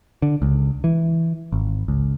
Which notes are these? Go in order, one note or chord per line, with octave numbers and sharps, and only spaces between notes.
D3
C#2
E3
G#1
C#2